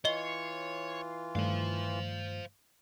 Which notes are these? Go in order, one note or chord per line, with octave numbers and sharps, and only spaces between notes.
E3 F4 C#5 D#5 C7 G7
G2 D#3 A3 C5 F5